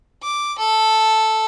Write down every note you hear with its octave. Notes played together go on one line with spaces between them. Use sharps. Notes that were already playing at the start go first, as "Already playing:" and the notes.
D6
A4